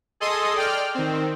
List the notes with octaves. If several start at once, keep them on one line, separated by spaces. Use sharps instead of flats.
G#4 A4 D#5 C6 D#6
D5 G5 F6
D#3 C4